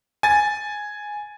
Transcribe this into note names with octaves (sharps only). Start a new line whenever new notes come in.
G#5 A6